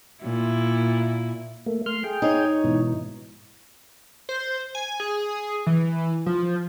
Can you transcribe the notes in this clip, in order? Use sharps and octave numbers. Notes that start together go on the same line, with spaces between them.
A#2 E4
A3 A#3
A3 C6 F6
G#4 G5
D#4 C#5
G#2 B2 E3
C5
G#5
G#4
E3
F3